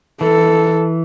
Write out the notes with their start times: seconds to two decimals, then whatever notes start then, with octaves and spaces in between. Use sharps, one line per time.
0.21 E3 A4